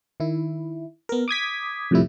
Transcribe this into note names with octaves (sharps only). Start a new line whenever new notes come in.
D#3 E4
B3 A#4
D6 D#6 G#6 B6
F2 A2 C3 F3 G3 E4